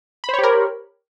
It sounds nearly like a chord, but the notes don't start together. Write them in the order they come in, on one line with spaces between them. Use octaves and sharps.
B5 C5 C#5 G4 A#4